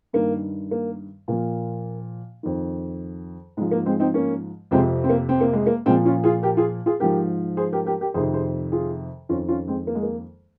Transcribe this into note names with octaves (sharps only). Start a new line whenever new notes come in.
G2 D#3 A#3
A#3
A#2 F3 A#3
F2 D#3
G#2 F3 G#3
A#3
G#3 C4
C4 D#4
A#3 C#4
F2 C3 F3 G#3 C4
C4
A#3
C4
A#3
G#3
A#3
A#2 F3 G#3 C4
C#4 F4
F4 G#4
G4 A#4
F4 G#4
F4 G#4
G#2 F3 G4 A#4
G#4 C5
G4 A#4
G4 A#4
G4 A#4
F2 C3 D#3 G#4 C5
G#4 C5
F4 G#4
F2 D#3 C#4 F4
C#4 F4
G#3 C4
A#3
G#3
A#3